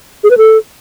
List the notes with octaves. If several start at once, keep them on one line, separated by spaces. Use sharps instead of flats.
G#4
B4
A4